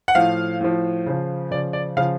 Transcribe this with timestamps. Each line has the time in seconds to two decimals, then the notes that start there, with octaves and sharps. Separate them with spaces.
0.08 F#5
0.15 A2 F3 F5
0.61 A2 F3
1.06 C#3 F3
1.51 C#3 F3 D5
1.73 D5
1.97 C#3 F3 F5